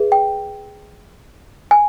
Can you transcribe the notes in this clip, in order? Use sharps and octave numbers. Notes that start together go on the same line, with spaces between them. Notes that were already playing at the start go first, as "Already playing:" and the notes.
Already playing: G#4 B4 E5
G5
G#5